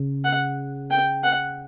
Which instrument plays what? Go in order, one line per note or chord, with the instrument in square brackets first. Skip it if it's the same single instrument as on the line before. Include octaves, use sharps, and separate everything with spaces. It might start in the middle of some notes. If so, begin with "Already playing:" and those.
Already playing: [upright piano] C#3
[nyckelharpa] F#5
G5
F#5